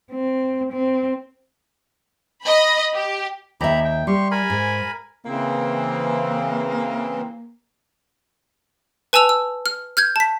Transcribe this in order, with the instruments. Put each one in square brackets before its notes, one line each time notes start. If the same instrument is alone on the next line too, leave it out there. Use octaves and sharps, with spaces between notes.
[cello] C4
C4
[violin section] D#5 B5
G4
[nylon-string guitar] D#2 E5 [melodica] G4 A#5 B5
[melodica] G5
[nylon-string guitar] G3 [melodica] G4 C6 C#6
[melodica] A#4 G#5 B5
[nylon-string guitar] G#2
[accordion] C#3 E3 C4 [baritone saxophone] A#3
[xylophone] B4 G#5 A5 E6 F7
E6
F6
F6 G6 G#6
A5 B6